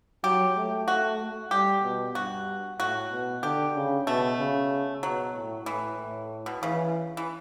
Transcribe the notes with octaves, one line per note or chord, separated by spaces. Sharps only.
F#3 G4
A3
F#4
G3 G4
B2
G2 F#4
A2 F#4
B2
D3 G4
C#3
B2 A3
C#3
B2 F#3
A2
A2 E3
A2
B2
C#3 E3
E3